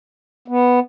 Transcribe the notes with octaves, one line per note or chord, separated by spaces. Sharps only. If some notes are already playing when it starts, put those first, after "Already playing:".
B3